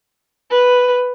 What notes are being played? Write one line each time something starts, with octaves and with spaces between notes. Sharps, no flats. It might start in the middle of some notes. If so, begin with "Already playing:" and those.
B4